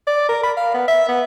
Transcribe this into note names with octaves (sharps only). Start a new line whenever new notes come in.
D5
A#4
B5
F5
B3
E5
B3